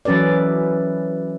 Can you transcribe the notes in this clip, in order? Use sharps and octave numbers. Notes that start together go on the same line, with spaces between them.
E3 F#3 C#4 A4 B4 D5